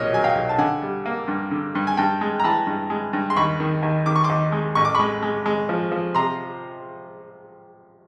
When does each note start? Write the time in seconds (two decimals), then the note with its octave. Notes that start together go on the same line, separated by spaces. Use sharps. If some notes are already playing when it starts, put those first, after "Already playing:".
Already playing: B1 A#2 A#4 C#5 D#5
0.13 F#3 G#5
0.24 F5 G5
0.35 B1
0.49 A5
0.58 D3 F#5 G#5
0.82 G3
1.06 A#3
1.28 G2
1.51 D3
1.75 G2
1.87 G#5
1.97 G2 G5 A5
2.21 G#3
2.40 A#5
2.44 E3 A5 B5
2.67 G2
2.90 G#3
3.13 G2
3.30 C6
3.36 D#2 B5 C#6
3.60 D#3
3.83 D#2
4.06 D#3 D6
4.16 C#6
4.24 C6 D6
4.30 D#2
4.52 G#3
4.75 A1 C#6
4.85 D6
4.95 G#3 B5 C#6
5.23 G#3
5.46 G#3
5.69 F3
5.92 F3
6.15 C3 A#5 C6